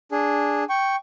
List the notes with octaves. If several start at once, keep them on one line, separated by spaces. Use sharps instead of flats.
D4 G#4
G5 C#6